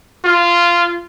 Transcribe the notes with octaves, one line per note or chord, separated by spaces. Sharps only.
F4